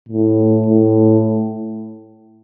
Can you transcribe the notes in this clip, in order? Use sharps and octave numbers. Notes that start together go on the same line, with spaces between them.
A2
A2